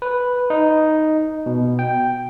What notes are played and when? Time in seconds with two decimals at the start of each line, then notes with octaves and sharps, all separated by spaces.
0.02 B4
0.50 D#4
1.46 B2
1.79 G5